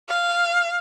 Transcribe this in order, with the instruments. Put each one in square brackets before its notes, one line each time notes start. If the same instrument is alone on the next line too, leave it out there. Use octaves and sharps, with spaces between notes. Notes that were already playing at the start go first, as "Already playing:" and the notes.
[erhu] F5